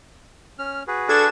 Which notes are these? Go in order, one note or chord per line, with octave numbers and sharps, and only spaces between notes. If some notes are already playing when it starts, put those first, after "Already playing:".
C#4 F6
F#4 G#4 B4
D4 A4 G#6 E7